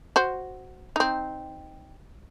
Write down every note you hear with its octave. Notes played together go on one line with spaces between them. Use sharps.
F#4 C5
C4 D#4